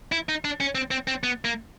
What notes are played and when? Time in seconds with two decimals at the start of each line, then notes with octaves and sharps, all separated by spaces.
0.12 E4
0.29 D#4
0.45 D4
0.60 C#4
0.75 C4
0.91 C4
1.08 C4
1.23 B3
1.45 A#3